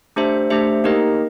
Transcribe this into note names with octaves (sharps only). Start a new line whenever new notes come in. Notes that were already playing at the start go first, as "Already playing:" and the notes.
A3 D4 G4 C5 E5
A3 D4 G4 C5 E5
A#3 D#4 G4 A#4 D#5